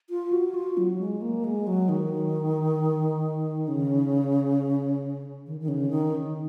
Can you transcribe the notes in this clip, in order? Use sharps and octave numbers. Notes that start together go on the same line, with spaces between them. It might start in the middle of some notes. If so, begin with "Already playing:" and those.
F4
F#4
F4
F#3
G#3
A#3
G#3
F#3
D#3
C#3
D#3
D#3
C#3
D#3